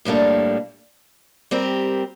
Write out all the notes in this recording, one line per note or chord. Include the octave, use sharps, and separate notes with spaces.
A2 G3 A#3 D4 A4
G3 C4 G4 A#4